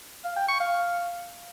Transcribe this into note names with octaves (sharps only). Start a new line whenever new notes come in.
F5
G5
C#6
F5